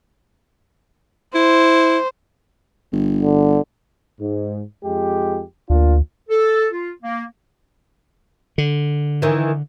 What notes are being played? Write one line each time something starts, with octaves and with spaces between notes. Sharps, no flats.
E4 C5
G1
D3
G#2
F2 G#3 G4
D2 A#3 D4 F4
A4
F4
A#3
D3
D#3 E3